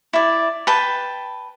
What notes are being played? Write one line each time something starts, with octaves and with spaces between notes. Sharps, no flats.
E4 D5
B4 G5 A5